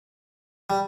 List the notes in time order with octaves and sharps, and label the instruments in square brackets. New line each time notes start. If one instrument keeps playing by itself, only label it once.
[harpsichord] G3